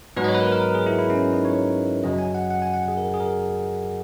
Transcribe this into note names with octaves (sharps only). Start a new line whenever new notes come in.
G#2 F#3 B3 B4
D#5
C#5
B4
A#4
B4
A#4
A#4
G#4
E4
E4
C#4
D#4
C#5
F#2 C#3 F#3 D#5
G#5
F#5
F#5
G#5
F#5
G#4
A#4
G#4
A#4